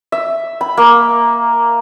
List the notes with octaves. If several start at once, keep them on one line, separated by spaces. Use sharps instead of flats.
E5
B5
A#3